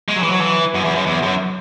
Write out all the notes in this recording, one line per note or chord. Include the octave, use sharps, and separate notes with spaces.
G#3
F#3
E3
F#3
E3
F#2
E2
F#2
E2
F#2